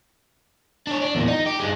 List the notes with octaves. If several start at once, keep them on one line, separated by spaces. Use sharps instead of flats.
D4 C#5
D4
E2 A#2
D#4
G4
G2 G#3